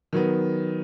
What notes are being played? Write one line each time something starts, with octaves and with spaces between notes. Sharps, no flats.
D#3 F#3 B3